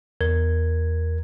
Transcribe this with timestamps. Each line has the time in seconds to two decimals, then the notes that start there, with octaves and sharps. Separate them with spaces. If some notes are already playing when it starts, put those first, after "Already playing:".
0.21 E2 A#4 G#6